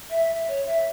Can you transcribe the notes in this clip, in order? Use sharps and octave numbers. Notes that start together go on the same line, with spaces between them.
E5
E5
C#5
E5